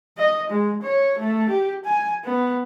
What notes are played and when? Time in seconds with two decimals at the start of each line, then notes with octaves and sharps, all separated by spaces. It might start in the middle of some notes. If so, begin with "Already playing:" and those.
0.18 D#5
0.50 G#3
0.82 C#5
1.19 A3
1.49 G4
1.85 G#5
2.25 B3